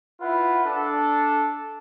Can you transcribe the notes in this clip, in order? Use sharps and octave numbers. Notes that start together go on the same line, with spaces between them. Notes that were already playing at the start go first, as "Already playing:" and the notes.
E4 F4 B4 F#5
D4 A4